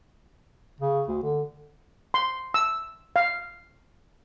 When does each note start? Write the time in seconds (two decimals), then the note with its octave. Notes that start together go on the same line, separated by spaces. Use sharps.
0.81 C#3
1.08 D2
1.23 D3
2.14 C6
2.54 E6
3.16 F5